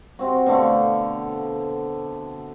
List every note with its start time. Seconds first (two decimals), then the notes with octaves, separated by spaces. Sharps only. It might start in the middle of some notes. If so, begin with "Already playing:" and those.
0.19 C3 C4 F#4
0.46 B2 D3 A3 F5